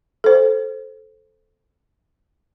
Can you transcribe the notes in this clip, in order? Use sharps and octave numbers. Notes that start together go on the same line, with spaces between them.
A4 C5